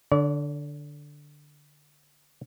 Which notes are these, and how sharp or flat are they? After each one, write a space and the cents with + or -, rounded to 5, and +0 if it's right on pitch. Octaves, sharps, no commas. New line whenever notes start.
D3 +0 D5 -45